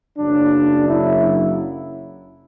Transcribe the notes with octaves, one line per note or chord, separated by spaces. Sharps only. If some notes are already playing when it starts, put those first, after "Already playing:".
F#1 F#2 C#3 F#3 D4
E4